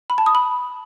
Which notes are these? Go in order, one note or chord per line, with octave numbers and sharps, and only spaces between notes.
B5
A5
D#6
B5